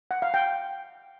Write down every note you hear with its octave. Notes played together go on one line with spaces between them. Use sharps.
F#5
F5
G5